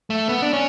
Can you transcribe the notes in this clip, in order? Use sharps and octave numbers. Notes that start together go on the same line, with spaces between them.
A3
B3
D4
C#4